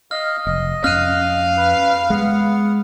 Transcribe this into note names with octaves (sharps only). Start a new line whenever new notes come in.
D#5 F5 F6
F1 D#5
F2 C#4 F5 F6 F#6 D#7
B4
G#3 B3 F#5